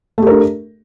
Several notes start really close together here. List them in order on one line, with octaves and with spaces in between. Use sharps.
A3 G4 A#4 D4